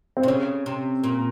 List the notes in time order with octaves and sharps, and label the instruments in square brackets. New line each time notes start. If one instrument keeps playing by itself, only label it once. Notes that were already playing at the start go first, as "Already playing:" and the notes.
[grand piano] C4
[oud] C3
[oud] C#3 [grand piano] C#4
[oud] C3
A#2